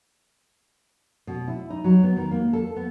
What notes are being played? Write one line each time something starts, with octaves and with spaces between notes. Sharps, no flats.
B2
E4
D#4
F#3
B3
D#3
A#3
A4
B3